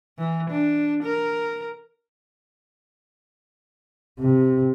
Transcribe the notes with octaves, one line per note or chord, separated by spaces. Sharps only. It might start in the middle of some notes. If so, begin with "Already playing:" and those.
E3
D4
A#4
C3